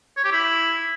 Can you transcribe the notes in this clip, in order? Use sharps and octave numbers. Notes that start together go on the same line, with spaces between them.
C#5
G4
E4